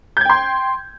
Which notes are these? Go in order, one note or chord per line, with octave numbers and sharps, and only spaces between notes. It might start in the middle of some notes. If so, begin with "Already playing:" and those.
G5 C6 G6 G#6